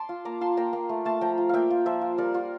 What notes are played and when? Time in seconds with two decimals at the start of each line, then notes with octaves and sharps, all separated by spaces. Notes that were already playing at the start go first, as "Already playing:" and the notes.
Already playing: A5 C6 D6
0.09 F4
0.25 A#3 A#5 D6
0.41 F4 A5 C6
0.57 A#3 G5 A#5
0.73 A#3
0.89 A3
1.05 A3 A5 C6
1.21 F3 G5 A#5
1.38 F4
1.49 A#3 E5 F5 G5
1.70 F4
1.86 F3 C5 E5
2.01 F4
2.18 G3 A#4 D5
2.34 F4